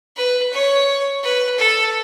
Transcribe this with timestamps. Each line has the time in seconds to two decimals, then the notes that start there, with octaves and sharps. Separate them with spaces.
0.17 B4
0.53 C#5
1.23 B4
1.58 A4